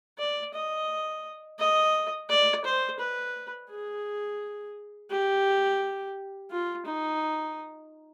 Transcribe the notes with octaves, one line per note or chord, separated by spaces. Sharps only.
D5
D#5
D#5
D5
C5
B4
G#4
G4
F4
D#4